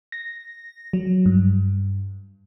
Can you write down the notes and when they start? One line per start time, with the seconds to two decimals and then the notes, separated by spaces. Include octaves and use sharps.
0.12 A#6
0.93 F#3
1.26 G2